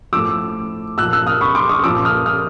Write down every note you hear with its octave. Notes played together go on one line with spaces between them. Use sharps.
A2 F3 D6 E6
A#2 F3 E6 F#6
E6 F#6
D#6 F6
B5 C#6
C6 D6
C#6 D#6
A#2 F3 D6 E6
D#6 F6
D#6 F6